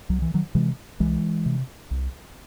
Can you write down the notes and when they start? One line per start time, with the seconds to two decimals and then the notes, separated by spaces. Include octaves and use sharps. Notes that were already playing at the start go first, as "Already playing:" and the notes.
0.09 C2 F#3
0.22 E3
0.34 D#3 F#3
0.55 C3 E3 G#3
1.00 C2 E3 G#3
1.46 C3
1.91 C2